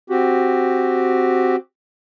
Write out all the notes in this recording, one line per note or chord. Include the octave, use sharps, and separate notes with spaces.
C4 F#4 G4